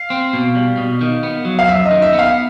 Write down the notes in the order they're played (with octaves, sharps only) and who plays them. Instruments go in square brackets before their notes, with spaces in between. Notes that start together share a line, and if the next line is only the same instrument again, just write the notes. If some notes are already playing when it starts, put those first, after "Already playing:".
Already playing: [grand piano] F5
[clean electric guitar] C4
B2
G3
B2
D#3
B3
F#3
[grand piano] F5
[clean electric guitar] F#2 [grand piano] E5
[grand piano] D#5
[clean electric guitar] D#3
[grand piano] E5
[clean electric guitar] B3
[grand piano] F5